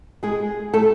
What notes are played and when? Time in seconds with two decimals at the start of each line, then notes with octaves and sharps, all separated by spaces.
0.23 G#3 G#4
0.74 A3 A4